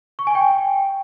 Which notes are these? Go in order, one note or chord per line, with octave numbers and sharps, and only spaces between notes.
C#6
G#5
G5